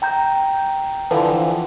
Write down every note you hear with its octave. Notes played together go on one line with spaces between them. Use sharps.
G5 A#5 G6
D3 E3 F3